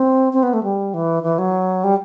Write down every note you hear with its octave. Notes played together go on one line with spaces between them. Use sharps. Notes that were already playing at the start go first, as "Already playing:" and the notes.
Already playing: C4
C4
B3
A3
G3
E3
E3
F#3
G3